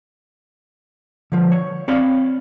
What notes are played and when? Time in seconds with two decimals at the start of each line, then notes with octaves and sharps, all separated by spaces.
1.32 D3 F3
1.52 C#5
1.88 C4 C#5 D5 F5 B5